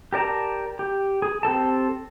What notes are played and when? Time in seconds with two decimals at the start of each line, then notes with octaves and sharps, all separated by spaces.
0.13 G4 A#4 D5 A5 A#5
0.79 G4
1.22 G#4
1.43 C4 G4 A4 A5